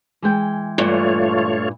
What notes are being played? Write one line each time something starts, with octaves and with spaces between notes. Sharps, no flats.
E3 G#3 G5
G2 A#2 A3 F4 C#5